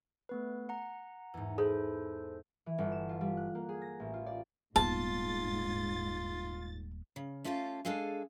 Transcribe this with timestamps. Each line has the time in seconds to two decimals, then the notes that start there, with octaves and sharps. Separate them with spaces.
0.29 A3 B3 B4
0.69 F#5 A#5
1.34 E2 G#2
1.58 G#4 A4 B4 C5
2.66 E3
2.78 G1
2.92 E7
3.09 F4
3.21 G3
3.37 F#6
3.55 A#3
3.69 G#4
3.82 A#6
4.00 A1
4.14 F4
4.26 D5
4.76 D#1 G#2 B3 F4 A5 A6
7.16 C#3
7.44 A3 C#4 F4 G4 A4 F5
7.85 G#3 D4 G#4 A4 F5 G#5